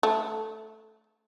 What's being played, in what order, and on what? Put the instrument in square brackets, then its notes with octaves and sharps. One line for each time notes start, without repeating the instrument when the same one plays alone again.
[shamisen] A3